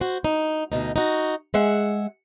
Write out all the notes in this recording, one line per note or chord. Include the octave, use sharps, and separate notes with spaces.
F#4 C5
D#4
D2 G2 B2 D#4
D#4 F#4
G#3 G#4 E5 F#5